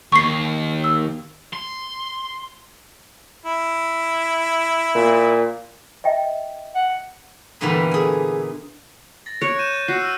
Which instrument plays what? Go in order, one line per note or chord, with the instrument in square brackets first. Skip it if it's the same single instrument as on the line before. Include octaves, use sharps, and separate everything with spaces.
[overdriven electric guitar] D#2 [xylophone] C#6 C7
[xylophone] E6
[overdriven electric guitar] C6
[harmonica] E4
[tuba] A#2
[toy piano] D#5 E5 G5
[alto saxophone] F#5
[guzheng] G2 A#2 D3 E3 A3 B3
G#4 G#5
[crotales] A6 A#6
[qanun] C#5 [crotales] F#6 D7
[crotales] G6 D#7 E7
A6
[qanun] F#4 [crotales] E6 C7
[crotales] E6 F6 D#7